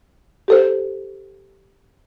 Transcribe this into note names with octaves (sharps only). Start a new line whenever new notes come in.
G4 A4 C5